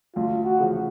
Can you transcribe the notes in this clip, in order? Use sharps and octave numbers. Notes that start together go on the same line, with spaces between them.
D2 F4
F#4
C#3 F3